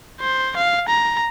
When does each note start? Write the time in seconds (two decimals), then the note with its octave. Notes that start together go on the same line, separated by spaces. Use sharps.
0.21 C5
0.56 F5
0.88 A#5